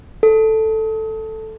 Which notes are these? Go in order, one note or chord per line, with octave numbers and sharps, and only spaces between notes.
A4